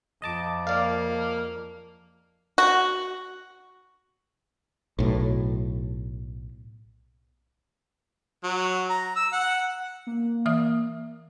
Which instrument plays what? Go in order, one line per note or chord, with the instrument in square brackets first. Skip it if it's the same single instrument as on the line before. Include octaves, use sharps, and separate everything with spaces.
[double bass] F2 [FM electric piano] D#5 A5 D6
[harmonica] A#3 [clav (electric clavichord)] D5 F5
[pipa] F#4
[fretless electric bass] B1 A2
[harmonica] F#3
A#5
E6
F#5
[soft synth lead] A#3
[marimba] E3 E5 D#6